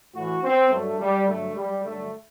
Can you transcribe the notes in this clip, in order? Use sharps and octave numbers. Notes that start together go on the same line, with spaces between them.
A2 E3 F#4
C4
G2 F#3 A3
G3
G2 D3 F#3 A3
G3
G2 D3 F#3 A3